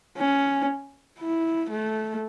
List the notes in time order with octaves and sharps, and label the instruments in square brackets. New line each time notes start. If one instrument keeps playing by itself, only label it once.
[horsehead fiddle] C#4
E4
A3